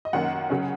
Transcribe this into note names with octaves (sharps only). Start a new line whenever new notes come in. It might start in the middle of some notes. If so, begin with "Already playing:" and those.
D#5
F#2 D#3 A#3 C#4 F#5
C#3 F#3 C#4